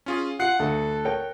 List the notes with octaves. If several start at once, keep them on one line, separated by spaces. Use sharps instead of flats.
C#4 F4 G#4
F4 F#5 F#6 C7 C#7
D2 A4
A#4 C#5 G5